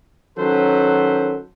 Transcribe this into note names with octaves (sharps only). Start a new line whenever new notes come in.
D#3 F#3 C#4 A4 B4 C5